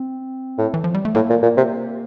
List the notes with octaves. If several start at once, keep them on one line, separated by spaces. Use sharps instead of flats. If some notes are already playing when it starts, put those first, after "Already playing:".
Already playing: C4
A2
E3
F3
G3
A3
A2 A#3
A#2
A#2
C3